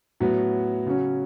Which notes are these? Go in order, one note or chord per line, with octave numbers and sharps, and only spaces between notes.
A2 F#3 B3 F#4
C#3 F#3 C#4 F#4